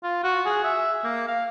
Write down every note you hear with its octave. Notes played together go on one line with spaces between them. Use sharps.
F4
F#4
G#4
E5
A#3
F5